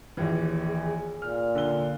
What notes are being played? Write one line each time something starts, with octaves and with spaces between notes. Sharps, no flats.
A#1 D#2 E3
G#4
A#2 F6
D3 G7